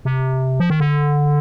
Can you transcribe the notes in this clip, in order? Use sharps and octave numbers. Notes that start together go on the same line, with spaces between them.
C3
F3
D#3
D3